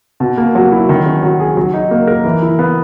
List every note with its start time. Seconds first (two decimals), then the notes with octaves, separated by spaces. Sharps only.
0.20 B2
0.38 A#3
0.55 F#3
0.72 E4
0.89 D#3
1.06 C#4
1.23 F#3
1.40 G#4
1.57 F#3
1.74 D#4
1.91 A#3
2.07 A#4
2.25 E3
2.42 E4
2.59 B3